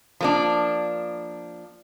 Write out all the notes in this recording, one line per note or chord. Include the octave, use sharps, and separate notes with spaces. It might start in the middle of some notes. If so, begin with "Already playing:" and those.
F3 A#3 D4